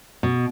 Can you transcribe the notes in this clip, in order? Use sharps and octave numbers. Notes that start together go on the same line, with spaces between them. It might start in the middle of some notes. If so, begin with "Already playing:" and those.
B2